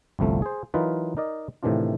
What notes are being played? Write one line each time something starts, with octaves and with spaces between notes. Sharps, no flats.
G1 C2 F3 A3
G#4 C5
E3 F#3 D#4 F4 A#4 B4
D#4 A#4 D5 D#5
A2 C3 D#3 E3 D4 F4